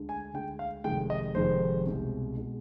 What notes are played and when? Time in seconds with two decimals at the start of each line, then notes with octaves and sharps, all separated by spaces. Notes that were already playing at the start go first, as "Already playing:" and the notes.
Already playing: D2 D3 G#3
0.09 G#5
0.34 D2 D3 G#3 G5
0.59 F5
0.84 F1 F2 D#3 G#3 G5
1.10 D#5
1.34 F1 F2 D#3 G#3 C5
1.86 C2 B2 G#3
2.37 B2 G#3